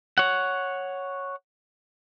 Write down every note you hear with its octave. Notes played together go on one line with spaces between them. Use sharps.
C#5 F#5